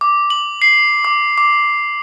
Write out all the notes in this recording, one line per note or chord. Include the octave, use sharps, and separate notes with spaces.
D6
F#7
C7
D6
D6